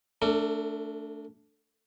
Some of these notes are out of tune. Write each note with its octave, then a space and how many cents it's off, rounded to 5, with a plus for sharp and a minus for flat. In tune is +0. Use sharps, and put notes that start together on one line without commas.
A3 +5 D4 -15 A#4 -45